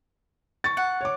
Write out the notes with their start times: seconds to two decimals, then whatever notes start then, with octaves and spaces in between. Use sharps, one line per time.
0.64 C#6 A6
0.77 F#5
1.01 C#5 D6